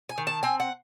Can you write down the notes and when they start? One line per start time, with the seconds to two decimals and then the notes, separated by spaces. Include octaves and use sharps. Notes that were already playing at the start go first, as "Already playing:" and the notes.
0.09 G#5
0.18 D#3
0.27 A5
0.43 C4 G#5
0.60 F#5